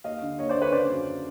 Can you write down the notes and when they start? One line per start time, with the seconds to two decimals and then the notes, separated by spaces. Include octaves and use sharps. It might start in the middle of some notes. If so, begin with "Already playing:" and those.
0.04 D#2 D#5 F5
0.22 D3
0.39 D#2 C#5 D#5
0.49 C5 D5
0.56 D3
0.61 B4 C#5
0.72 C#3 C5 D5
0.90 F#2